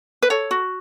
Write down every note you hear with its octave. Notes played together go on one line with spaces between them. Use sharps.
B4
A4 C#5
F#4